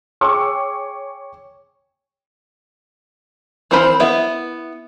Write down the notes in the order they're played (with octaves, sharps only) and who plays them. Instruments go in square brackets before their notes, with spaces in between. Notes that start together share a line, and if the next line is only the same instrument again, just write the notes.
[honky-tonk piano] G#4 C#5 G5 C#6 D6 E6
[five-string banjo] E3 C4 A#4 C5 B5
B3 E4 E5